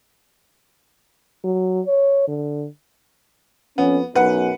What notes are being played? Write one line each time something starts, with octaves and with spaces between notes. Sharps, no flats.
F#3
C#5
D3
F2 B3 C#4
B1 F#2 B4 F#5